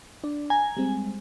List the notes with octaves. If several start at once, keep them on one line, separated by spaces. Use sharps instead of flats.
D4 D5
G#5 A#5
G3 G#3 C4